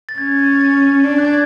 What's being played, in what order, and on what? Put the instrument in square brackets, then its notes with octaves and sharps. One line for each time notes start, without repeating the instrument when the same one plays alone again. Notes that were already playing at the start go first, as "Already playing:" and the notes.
[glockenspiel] A6
[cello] C#4 [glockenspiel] G#6
[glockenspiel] A6
A6
[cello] D4
[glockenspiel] F#6
G#6